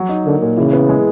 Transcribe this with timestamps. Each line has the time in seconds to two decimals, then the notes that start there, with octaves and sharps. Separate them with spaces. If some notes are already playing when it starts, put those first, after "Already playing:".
Already playing: F#3
0.09 D#4
0.26 D3 A#3
0.42 A#2
0.57 C#3 E3
0.73 B3
0.89 G#3